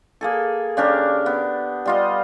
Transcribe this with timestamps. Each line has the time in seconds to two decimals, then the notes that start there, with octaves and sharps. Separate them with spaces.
0.21 A#3 G#4 A4
0.77 C#3 D4 G4 A#4
1.26 B3
1.86 G3 F4 D#5